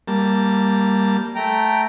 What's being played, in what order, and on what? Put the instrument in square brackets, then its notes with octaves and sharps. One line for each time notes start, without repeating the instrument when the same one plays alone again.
[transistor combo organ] G3 A#3 A5
[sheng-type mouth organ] A3 G5 A#5